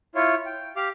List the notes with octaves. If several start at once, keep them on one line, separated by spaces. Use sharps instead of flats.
E4 F4 C#5
G5
G4 F5 D6